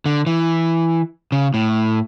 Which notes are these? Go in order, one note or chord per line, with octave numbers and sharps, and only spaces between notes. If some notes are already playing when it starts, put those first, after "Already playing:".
D3
E3
C#3
A2